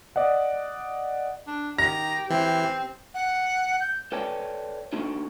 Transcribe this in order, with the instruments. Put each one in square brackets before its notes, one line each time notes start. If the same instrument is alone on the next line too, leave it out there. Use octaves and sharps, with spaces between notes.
[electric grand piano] D5 D#5 F#5
[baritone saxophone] D4
[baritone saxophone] D#3 [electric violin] G4 [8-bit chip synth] A#5 [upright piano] A#6
[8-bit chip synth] E3 [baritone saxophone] C4
[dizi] F#5
G6
[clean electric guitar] A4 B4 C#5 D5 G5 A5
A#3 D4 D#4 F#4 A4